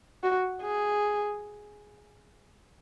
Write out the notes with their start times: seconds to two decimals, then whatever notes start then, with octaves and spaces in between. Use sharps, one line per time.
0.23 F#4
0.62 G#4